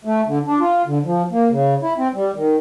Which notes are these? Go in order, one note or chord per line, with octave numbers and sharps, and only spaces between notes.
A3
D3
D4
F4
D3
F3
A#3
C#3
E4
C4
G3
D#3